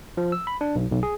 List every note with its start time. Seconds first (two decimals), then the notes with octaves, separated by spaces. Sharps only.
0.17 F3
0.32 E6
0.47 B5
0.61 D4
0.76 B1
0.91 B1
1.03 G#4